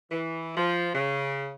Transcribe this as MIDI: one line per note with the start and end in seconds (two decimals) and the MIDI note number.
0.12 0.55 52
0.57 0.90 53
0.95 1.53 49